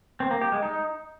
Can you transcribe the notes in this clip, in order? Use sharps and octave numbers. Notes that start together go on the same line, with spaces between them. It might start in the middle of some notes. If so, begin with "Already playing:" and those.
C4
A#3
G4
G#3
D#4